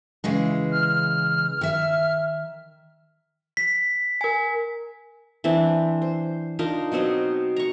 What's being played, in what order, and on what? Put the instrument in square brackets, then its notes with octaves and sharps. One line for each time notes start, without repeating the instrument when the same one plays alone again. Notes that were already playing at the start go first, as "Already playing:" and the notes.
[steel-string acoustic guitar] C#3 E3 G#3
[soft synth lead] F6
[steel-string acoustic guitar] D#3 E5
[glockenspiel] B6
[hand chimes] A#4 G#5
[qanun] E3 C4 D4
C5
D4 D#4 F4 A#4
B2 F#3 C4 D#4
A#5 C#6